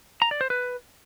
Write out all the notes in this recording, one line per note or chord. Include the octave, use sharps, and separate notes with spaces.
A#5
D5
C5
B4